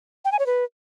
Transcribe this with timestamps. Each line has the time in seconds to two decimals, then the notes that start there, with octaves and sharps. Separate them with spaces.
0.25 G5
0.32 G#5
0.39 C#5
0.46 B4